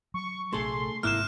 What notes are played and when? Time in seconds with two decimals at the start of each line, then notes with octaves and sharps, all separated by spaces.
0.14 F#3 C#6
0.52 A#1 C3 A3 D4 G#4 A4 C6
1.03 G#1 G#2 C3 A#3 E4 F6 F#6 E7